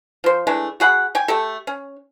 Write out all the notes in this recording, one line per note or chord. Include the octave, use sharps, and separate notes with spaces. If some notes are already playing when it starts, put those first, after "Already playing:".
F3 C5
E3 G#3 A3 D4
F#4 G#4 F#5 B5
G5 G#5
A3 G4 A4
C#4